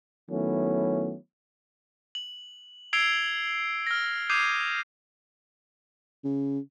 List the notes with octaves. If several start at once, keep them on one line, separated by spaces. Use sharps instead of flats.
D#3 F#3 A3 B3 C#4 E4
F#7
E6 G#6 C7 D7 F7 G7
F6 A#6
D6 D#6 G6 G#6 C7 D#7
C#3